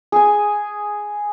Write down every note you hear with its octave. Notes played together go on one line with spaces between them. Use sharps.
G#4 G#5